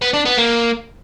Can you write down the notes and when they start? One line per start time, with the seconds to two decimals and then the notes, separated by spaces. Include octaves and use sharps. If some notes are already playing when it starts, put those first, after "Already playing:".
0.02 B3
0.14 D4
0.25 B3
0.37 A#3